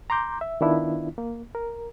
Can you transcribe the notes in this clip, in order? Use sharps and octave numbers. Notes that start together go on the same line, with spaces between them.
A#5 C6 D6 G6
E5
D#3 B3 D4 E4 F4
A#3
A#4